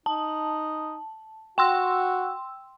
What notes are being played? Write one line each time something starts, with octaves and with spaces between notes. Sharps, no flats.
D#4 A5
F#4 G5 C6 E6